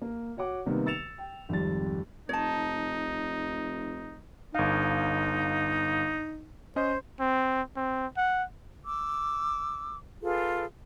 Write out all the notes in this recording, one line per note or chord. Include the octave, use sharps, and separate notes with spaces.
A#3
F#4 C#5 F#5 D6
C3 D#3 G3 A#3 B3
E6 A6 C#7 E7 F7
G5
G#1 F2 G3 A6
F1 D#4 C#5 A5
G1 D#4 F5
C#4 C5 D#5
C4
C4
F#5
D6 E6
F4 G#4 A4 B4